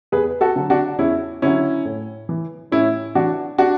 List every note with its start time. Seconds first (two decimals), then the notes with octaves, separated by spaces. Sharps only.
0.12 E2 G#4 B4
0.41 F#4 A4
0.56 D3 F#3
0.70 D4 F#4
0.99 E2 C#4 E4
1.42 D3 F#3 C#4 E4
1.85 A2
2.29 E3
2.72 A2 C#4 E4
3.15 E3 D4 F#4
3.58 D4 F#4